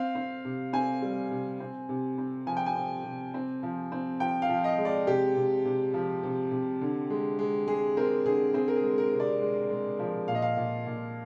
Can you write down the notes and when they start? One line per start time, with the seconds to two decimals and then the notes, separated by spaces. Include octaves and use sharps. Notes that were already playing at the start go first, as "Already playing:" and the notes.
Already playing: C4 F5
0.15 C4
0.45 C3
0.73 C4 G#5
1.02 G3
1.31 C3
1.60 C4
1.89 C3
2.18 C4
2.46 F3 G#5
2.57 G5
2.66 G#5
2.76 C4
3.04 C3
3.34 C4
3.63 F3
3.92 C4
4.20 F3 G5
4.42 F5
4.49 F3
4.64 D#5
4.78 G#3
4.85 D5
5.07 C3 G4
5.37 C3
5.65 C3
5.94 F3
6.23 C3
6.51 C3
6.81 D3
7.10 G#3
7.39 G#3
7.67 G#3 G#4
7.97 C4 A#4
8.26 D3 G#4
8.54 C4 G#4
8.68 A#4
8.76 G#4
8.83 G#3
8.98 A#4
9.12 C3
9.20 D5
9.41 G#3
9.70 G#3
9.99 F3
10.28 A#2 F5
10.35 D#5
10.42 F5
10.57 A#2
10.86 A#2